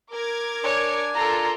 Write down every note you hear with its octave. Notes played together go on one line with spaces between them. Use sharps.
A#4 D6 G#6
D4 C#5 G#5
F4 A4 A#4 A#5